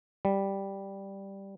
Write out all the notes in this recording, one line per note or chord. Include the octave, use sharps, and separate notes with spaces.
G3